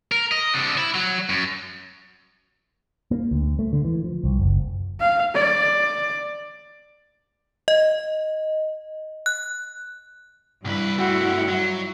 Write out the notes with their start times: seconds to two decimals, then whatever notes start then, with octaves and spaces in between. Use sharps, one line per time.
0.12 A#4
0.32 D#5
0.54 C3 D4
0.78 E4
0.95 F#3
1.30 F#2
3.11 A#3
3.31 D2
3.59 A3
3.73 D3
3.84 E3
4.04 F3
4.24 C2
4.39 F#1
5.00 F5
5.35 D5
7.68 D#5
9.26 F#6
10.65 C2 G2 E4 B4
10.99 A3 C4 F#4 F#5
11.49 F#3